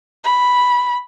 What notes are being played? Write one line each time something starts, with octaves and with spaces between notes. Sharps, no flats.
B5